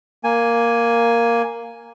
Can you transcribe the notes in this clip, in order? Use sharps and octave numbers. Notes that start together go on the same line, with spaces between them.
A#3 G#5